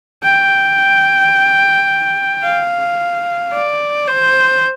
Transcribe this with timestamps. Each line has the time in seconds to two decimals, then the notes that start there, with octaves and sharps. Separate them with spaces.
0.24 G5
2.43 F5
3.53 D5
4.07 C5